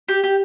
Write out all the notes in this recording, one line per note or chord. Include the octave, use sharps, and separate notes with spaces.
G4
G4